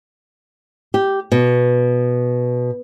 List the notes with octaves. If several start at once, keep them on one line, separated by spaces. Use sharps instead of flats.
G4
B2